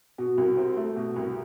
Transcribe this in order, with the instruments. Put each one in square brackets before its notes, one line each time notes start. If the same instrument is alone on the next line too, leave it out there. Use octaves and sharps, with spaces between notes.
[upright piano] B2 [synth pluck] F#4
[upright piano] C2
C4
A3
B2
C2